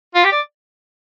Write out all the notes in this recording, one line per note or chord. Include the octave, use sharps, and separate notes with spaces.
F4
G4
D5